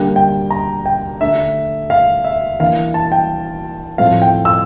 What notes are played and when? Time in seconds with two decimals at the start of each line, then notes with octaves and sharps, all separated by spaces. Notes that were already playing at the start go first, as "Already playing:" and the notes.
Already playing: D3 G3 A#3 D4 G5
0.16 G5
0.51 A#5
0.86 G5
1.21 D3 A3 D4 E5
1.90 F5
2.24 E5
2.60 E3 A#3 D4 F5
2.94 A5
3.12 G5
3.98 A2 F3 A3 C4 F5
4.22 G5
4.45 E6